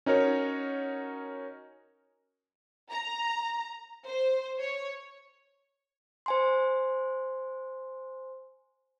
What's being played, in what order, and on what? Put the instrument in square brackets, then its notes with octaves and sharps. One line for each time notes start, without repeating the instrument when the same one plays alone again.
[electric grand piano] C#4 D#4 F#4 A#4 C#5
[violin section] A#5
C5
C#5
[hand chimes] C5 G#5 C6